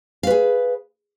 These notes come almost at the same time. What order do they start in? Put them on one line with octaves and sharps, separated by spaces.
F5 B4 G#4